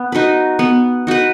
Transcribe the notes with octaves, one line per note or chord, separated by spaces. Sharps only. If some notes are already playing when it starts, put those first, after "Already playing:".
Already playing: B3
D#4 F#4 B4
B3
D#4 F#4 B4